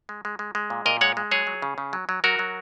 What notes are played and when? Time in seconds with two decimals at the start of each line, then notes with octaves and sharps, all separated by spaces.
0.09 G#3
0.25 G#3
0.39 G#3
0.55 G#3
0.70 A#2
0.86 A#2 A#4 D#5
1.01 G#3 C#5 F#5
1.17 G#3
1.31 F#3 G#4 C#5
1.47 F#3
1.62 C#3
1.78 C#3
1.93 F#3
2.09 F#3
2.24 F#3 F#4 A#4
2.39 F#3